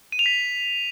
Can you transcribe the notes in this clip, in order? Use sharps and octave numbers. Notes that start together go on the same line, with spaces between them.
D#7
F7
B6